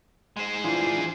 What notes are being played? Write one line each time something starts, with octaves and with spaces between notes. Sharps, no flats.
G#3 C5
E3 D4 F4 G#4 C5